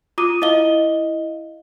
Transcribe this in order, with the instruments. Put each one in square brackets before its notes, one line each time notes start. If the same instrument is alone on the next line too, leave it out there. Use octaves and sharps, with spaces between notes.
[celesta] F4 D6 D#6 D#7
E4 D#5 F5 G7